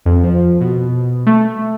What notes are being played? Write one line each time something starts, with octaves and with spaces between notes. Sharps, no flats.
F2
F3
B2
A3